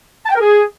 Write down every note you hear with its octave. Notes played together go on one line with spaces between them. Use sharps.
A5
G5
A#4
G#4